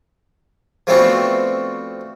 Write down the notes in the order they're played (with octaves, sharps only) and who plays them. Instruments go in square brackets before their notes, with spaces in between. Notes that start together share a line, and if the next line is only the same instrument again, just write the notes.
[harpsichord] F3 A3 B3 C4 D4 F#4